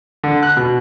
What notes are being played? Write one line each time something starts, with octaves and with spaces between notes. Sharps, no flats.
D3
F#6
B2